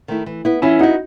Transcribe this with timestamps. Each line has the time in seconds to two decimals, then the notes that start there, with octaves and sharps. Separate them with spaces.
0.08 D#3 A3 E4
0.26 E3
0.45 B3 E4
0.62 E3 C#4 E4
0.79 B3 D#4 E4 F#4